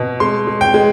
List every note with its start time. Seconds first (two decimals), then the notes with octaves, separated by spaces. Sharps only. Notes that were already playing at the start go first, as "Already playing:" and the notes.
Already playing: B2
0.20 G#3 C6
0.47 G#3
0.61 G5
0.74 G#3